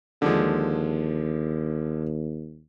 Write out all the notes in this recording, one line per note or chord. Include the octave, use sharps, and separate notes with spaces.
D#2 D3 F3 G#3